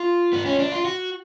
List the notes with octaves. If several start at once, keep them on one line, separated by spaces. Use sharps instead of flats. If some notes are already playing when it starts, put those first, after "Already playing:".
Already playing: F4
B3
C#4
D4
F4
F#4